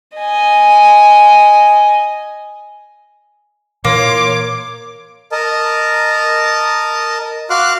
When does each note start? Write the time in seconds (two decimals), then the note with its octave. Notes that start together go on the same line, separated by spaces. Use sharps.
0.17 D#5 G#5
3.85 A#2 E3 A#3 C#5 C6 D6
5.32 A#4 D#5 A5
7.50 F#4 F5 C6 D6 F6 F#6